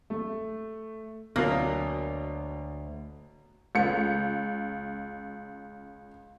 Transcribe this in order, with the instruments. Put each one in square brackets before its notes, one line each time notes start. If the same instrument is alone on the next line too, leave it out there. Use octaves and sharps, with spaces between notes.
[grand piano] A3
[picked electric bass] D2 [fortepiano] B2 F#3 [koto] A#3
[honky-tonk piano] C#2 C#7